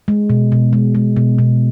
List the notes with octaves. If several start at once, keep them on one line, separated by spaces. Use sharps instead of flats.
G#3
B2
B2
G#3
G#3
B2
B2